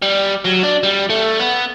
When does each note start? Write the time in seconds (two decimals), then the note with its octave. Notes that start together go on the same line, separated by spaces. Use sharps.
0.02 G3
0.45 F#3
0.63 D4
0.83 G3
1.10 A3
1.40 B3